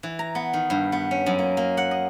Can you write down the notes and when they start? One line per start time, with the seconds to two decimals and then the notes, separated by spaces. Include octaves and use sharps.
0.03 E3
0.19 A#5
0.35 B3
0.53 D#3
0.70 G2
0.92 B3
1.11 C#4
1.26 F#2
1.39 A#3
1.57 A#3
1.77 F#5
1.91 D#5